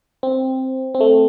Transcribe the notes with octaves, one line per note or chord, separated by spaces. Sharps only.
C4
C4
A3